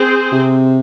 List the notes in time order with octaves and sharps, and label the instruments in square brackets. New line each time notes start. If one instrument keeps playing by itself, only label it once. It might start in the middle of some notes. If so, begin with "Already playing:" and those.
Already playing: [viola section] C4 G#4 C5
[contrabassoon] C3